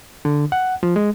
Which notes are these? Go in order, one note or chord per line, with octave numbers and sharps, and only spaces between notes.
D3
F#5
F3
G#3